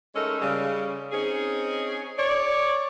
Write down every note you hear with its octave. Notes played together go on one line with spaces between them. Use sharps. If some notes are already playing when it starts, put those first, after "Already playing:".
G#3 A3 C#4 D#4 A4 A#4
C#3 G3
C4 C#4 D#4 G#4
C#5 D5